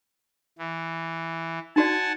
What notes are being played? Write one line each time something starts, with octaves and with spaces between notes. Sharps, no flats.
E3
D#4 F#4 D5 F#5 G#5 A5